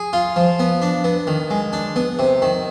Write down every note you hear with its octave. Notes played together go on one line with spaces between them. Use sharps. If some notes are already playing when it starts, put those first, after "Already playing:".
Already playing: G#4
F4
F3
B3
D4
B3
D#3
G#3
D4
B3
C3
D#3